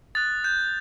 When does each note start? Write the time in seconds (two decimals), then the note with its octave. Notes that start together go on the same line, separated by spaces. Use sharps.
0.15 D#6 F#6 A6
0.44 G6